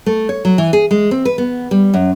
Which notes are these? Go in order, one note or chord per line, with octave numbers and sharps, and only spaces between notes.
A3
C#5
F#3
E3
G#4
G#3
C4
B4
B3
G3
F#2